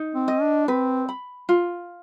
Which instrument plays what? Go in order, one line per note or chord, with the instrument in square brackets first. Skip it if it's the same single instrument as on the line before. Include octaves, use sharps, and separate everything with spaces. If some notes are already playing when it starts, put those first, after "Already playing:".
Already playing: [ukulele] D#4
[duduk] C4
[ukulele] D#5
[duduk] D4
[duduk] C4 [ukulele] B4
[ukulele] B5
F4